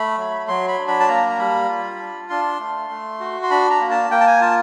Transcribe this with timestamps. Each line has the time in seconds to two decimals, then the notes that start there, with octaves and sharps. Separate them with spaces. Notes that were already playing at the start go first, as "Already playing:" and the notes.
Already playing: A3 B5
0.18 F#3
0.48 F#3 C6
0.68 B5
0.78 D4
0.88 B5
1.00 A5
1.08 A#3 A#5
1.29 A#5
1.38 G3 B5
1.68 F4
2.00 D4
2.30 D4 C6
2.60 A3
2.90 A3
3.20 F#4
3.43 C6
3.50 D4 B5
3.70 A#5
3.80 A#3
3.91 A5
4.11 A#3 G5
4.21 A5
4.27 G#5
4.41 F4 A5